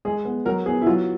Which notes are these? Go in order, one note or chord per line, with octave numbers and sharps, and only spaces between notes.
G#3 G#4
B3
F#3 A#4
B3 G#4
E4
F#3 F4